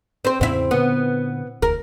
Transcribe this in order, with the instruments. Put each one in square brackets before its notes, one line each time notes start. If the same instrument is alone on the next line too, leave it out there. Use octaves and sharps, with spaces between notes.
[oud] C4 C5
[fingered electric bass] E2 A2 C#3 [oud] C4 E4
[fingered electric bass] A#2 D3 [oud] B3
[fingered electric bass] E1 D2 [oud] A#4